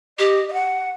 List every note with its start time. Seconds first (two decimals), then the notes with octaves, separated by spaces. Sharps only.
0.19 G4 D#5
0.48 D#5
0.54 F#5